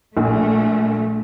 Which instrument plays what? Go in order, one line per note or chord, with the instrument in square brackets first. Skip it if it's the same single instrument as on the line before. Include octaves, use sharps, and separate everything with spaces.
[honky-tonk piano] A#1 [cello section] A3